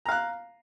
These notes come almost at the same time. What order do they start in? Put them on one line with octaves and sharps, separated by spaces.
A#5 F5 F#6